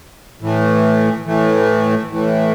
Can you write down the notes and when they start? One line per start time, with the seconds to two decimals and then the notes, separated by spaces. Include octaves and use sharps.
0.41 A2 E3 A3
1.26 A2 E3 A3
2.12 A2 E3 A3